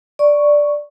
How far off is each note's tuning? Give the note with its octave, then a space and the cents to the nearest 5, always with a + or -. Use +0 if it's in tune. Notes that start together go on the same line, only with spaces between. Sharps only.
D5 +0 C#6 +0